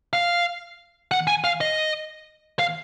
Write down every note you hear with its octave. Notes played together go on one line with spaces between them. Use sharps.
F5
F#5
G#5
F5
D#5
F5